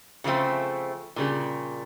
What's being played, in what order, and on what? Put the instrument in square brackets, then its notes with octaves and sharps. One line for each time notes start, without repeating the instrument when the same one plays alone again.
[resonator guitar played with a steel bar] C#3 F3 F#3 A3 C4
A#2 C#3 G3